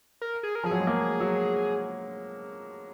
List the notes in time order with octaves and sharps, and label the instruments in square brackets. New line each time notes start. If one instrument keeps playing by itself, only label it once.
[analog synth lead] A#4
G#4
A#4
[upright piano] F3 [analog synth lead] G#4
[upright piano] F#3
G#3
A#3
F#3